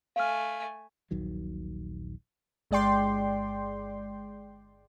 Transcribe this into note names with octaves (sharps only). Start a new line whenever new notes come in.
A3 F5 G#5 F6
D#1 A#1 D#3 F#3
G1 G#3 D5 G5 C6